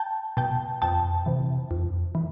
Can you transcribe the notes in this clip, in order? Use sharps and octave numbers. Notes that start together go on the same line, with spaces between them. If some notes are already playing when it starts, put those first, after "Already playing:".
Already playing: G5 A5
B2 G5 A5
F2 G5 A5
C3 E3
F2
E3